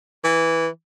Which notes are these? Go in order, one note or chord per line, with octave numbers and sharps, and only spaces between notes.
E3